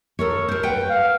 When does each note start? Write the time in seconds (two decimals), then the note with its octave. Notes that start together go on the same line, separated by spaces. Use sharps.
0.19 A4 A#4 C#5
0.48 A#4 C5
0.63 B4 F#5 G5
0.90 F5